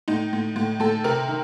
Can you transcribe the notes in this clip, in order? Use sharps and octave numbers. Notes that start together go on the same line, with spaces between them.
A2 D#4
A2
A2
A2 A4
C3 A#4
D#3